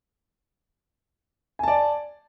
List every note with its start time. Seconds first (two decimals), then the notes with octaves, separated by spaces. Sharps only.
1.59 G#5
1.63 A5
1.68 D5